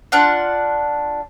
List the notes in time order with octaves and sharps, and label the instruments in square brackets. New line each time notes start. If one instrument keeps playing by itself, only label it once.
[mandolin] D4 F4 F#5